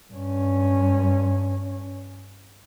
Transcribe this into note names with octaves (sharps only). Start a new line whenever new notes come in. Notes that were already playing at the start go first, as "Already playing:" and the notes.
G2 C#4